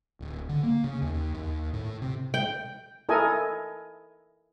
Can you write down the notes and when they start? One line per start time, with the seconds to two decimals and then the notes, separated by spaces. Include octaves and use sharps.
0.20 D1
0.49 D3
0.63 A#3
0.84 C#3
1.02 D#2
1.35 D#2
1.73 A2
2.02 C3
2.34 G5
3.09 E4 A4 A#4 D#5 G#5